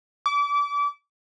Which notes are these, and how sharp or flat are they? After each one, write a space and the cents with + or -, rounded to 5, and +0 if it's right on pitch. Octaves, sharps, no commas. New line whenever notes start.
D6 -30